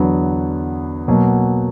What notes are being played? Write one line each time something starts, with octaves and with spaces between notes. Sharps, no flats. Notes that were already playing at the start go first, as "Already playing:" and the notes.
Already playing: E2 D3 F#3 B3
B2 F#3 A#3